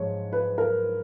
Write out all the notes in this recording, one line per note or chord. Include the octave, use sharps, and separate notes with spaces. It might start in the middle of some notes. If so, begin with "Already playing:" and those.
Already playing: G#2 F3 G#3 C#5
B4
A#4